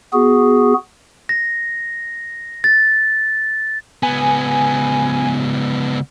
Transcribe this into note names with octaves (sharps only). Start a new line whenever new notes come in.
B3 F#4 G#4
A#6
A6
C#2 B3 G#5